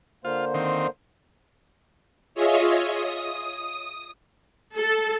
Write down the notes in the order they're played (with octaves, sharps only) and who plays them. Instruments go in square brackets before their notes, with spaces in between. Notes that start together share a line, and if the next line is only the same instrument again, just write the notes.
[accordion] D3 A#3 C5 [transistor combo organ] F4
[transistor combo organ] D#3 C4
[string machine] F4 G#4 C#5 D#5 E5
D#6
[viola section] A4